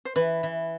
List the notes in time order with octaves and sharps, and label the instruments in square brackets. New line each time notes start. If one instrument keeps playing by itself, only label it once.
[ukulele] C5
[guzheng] E3 [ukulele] B4
[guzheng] E3